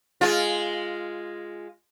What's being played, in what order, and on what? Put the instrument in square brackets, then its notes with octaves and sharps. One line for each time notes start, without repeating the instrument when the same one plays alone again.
[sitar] G#3 F4